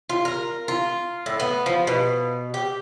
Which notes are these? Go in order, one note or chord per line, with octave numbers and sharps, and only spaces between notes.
F4
A#4
F4
A2
B3
F3
B2
G4